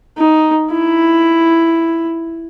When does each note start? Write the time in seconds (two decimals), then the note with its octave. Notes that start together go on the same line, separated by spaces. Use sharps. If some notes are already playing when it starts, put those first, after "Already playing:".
0.18 D#4
0.71 E4